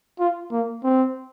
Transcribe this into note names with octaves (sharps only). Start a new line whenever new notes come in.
F4
A#3
C4